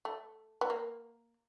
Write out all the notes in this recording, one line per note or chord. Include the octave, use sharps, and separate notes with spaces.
A3
B3
A#3